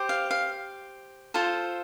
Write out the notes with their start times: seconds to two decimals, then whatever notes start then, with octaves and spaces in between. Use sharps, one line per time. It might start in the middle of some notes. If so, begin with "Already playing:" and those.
Already playing: G4 C5
0.09 F5
0.31 F5
1.34 F4 A4 C5 F5